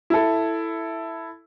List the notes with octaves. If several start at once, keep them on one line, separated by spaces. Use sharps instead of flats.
E4 A4